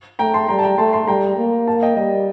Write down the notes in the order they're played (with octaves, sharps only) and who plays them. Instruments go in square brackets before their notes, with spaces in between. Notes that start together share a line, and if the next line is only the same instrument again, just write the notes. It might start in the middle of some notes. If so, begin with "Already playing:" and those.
[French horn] A3 [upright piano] G5 A#5
[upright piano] A5 C6
[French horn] G3 [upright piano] G5 A#5
[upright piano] A5
G5 A#5
[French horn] A3 [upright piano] A5 C6
[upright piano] A5 C6
[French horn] G3 [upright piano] G5 A#5
[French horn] A#3
[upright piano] F5 A5
D#5 G5
[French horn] G3 [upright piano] D#5